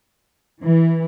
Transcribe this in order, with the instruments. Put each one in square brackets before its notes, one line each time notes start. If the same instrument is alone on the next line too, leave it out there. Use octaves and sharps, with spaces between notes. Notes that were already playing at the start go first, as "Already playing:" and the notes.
[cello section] E3